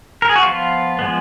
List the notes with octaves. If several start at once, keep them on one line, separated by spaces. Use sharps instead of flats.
A#4
G#4
F#4
F3 B3 F4
F3 G#3 B3